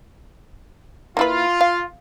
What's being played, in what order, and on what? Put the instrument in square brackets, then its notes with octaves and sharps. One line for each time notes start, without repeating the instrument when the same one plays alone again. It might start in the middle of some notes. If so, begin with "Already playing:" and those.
[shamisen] A#3 E4 B4 [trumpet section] F4
[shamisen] F5